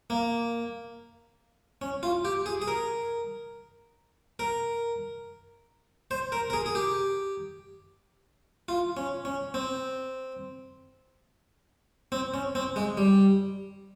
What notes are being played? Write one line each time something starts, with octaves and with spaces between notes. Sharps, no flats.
A#3
C#4
F4
G4
G#4
G#4
A#4
A#4
C5
A#4
A#4
G#4
G#4
G4
F4
C#4
C#4
C4
C4
C#4
C4
G#3
G3